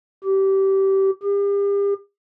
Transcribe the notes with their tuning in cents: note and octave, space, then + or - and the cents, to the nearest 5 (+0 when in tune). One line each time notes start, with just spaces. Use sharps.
G4 -20
G4 +40